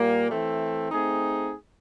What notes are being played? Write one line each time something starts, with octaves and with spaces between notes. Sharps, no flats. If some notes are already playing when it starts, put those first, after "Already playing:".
Already playing: A#2 G3 A#3
E3 A3 C4
A3 C4 D#4 G#4